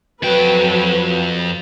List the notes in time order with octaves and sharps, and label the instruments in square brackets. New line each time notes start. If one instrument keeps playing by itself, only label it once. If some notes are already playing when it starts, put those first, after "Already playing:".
[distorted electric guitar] F2 G5 [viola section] F#3 B4